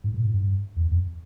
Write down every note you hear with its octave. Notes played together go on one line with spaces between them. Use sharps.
G#2
A#2
G#2
G2
E2
F2